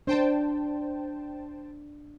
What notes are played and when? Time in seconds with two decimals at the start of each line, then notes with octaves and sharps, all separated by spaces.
0.07 D4 C5 G5 A5